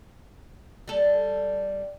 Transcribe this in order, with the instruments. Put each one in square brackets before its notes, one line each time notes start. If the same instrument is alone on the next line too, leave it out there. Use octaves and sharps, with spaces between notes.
[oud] G3 A4